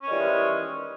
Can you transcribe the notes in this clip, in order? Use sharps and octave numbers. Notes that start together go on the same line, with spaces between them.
D#3 E3 G3 G#3 C#4